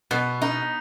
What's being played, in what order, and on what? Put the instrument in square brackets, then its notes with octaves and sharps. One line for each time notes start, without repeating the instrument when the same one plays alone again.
[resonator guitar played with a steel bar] B2 [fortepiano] B3
[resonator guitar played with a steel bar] D#4